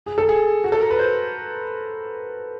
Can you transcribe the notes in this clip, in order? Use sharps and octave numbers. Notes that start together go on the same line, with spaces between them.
G#4
A4
G#4
F#4
A4
A#4
B4
C5